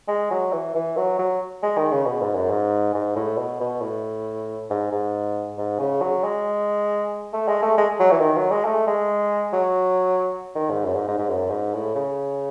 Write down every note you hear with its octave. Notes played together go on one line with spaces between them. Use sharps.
G#3
F#3
E3
E3
F#3
F#3
G#3
D#3
C#3
B2
G#2
F#2
G#2
G#2
A2
B2
B2
A2
G#2
G#2
G#2
C#3
F#3
G#3
A3
G#3
A3
G#3
F#3
E3
D#3
F#3
G#3
A3
G#3
F#3
D#3
G#2
F#2
G#2
G#2
G#2
F#2
G#2
A2
C#3